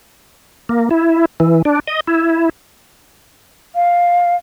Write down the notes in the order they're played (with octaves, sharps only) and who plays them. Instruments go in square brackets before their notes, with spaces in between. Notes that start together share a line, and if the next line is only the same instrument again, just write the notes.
[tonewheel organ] A#3
E4
E3
D4
D#5
E4
[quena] F5